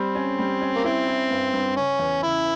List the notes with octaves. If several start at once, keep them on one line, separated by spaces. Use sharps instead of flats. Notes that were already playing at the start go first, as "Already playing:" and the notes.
Already playing: G3 C4
C#4
G3
C#4
A#3
C4 E4
E4
G2
G2
C#3 C#4
E2
C#3 E4